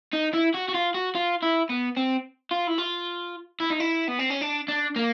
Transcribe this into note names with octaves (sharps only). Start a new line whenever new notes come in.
D#4
E4
F#4
F#4
F4
F#4
F4
E4
B3
C4
F4
E4
F4
E4
D#4
E4
B3
C4
C#4
D4
D4
A#3